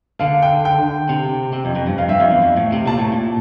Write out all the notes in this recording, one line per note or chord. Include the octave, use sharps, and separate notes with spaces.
D3 F5
G5
G5
C3
C3
F2
F2
G2
F2 F5
G2 E5
F2 F5
E2
F2
A2
C3
A#2 A5
A2
A#2